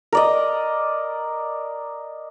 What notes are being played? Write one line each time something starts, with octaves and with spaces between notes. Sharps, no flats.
A#4 D5 D#5